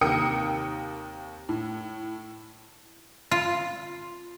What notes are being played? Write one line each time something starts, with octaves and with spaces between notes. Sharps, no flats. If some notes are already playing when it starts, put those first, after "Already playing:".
D#2 C3 A#4 G5 D#6 C#7
A2
F4